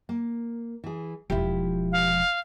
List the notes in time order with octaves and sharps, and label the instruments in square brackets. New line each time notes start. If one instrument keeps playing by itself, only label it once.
[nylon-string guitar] A#3
E3 G#4
[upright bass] E1 F3 [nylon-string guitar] E4 F4 G4
[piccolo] F5